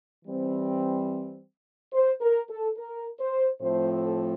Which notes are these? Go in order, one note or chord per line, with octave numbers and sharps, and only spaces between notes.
E3 G3 C4
C5
A#4
A4
A#4
C5
A2 F3 A3 C4 C5
A4